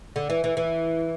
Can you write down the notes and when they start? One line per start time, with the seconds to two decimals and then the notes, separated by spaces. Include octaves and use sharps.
0.16 D3
0.30 E3
0.44 E3
0.57 E3